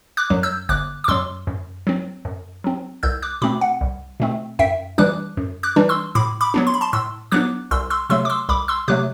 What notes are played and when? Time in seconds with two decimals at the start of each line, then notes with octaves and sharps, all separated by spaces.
0.17 D6 F#6
0.30 F#2 F#3
0.43 E6 G6
0.69 G1 D6 F#6
1.04 D6
1.08 F#2 F#3 C6 E6
1.47 F#2
1.87 F#3 C4
2.25 F#2
2.64 F#3 C4
3.03 C2 E6 G6
3.22 D6 F#6
3.42 B2 A3 C4 B5 D6
3.61 F#5
3.81 C2
4.20 B2 A3 C4
4.59 F#2 E5 G5
4.98 E3 G3 D4 D6 F#6
5.37 F#2
5.63 D6 F#6
5.76 E3 G3 D4
5.89 C6 E6
6.15 A2 B5 D6
6.41 B5 D6
6.54 F#3 B3 D4
6.67 C6
6.74 B5
6.81 A5 C6
6.93 A2 C6 E6
7.32 F#3 B3 D4 D6 F#6
7.71 C2 C6 E6
7.90 C6 E6
8.10 C3 F#3 A3 C6 E6
8.25 D6
8.30 C6 E6
8.49 C2 B5 D6
8.68 C6 E6
8.88 C3 F#3 A3 D6 F#6